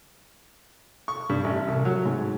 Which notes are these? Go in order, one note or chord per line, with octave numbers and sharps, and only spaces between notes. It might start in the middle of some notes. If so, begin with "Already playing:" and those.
C#6
G2
A1
C2
F#3
G#2